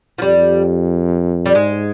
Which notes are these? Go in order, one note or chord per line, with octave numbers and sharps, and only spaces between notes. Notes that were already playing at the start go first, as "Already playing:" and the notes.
F3
F2 G3
G3
G#2 G#3